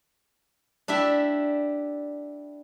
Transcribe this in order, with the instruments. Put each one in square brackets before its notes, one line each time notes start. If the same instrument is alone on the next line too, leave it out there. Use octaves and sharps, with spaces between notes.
[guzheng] D4 E4 G4 E5